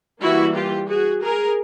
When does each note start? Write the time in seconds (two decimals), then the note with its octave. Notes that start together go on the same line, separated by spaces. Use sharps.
0.21 E3 G3 A#3 E4 F#4
0.55 F4 G4
0.88 F#4 G#4
1.21 G#4 A#4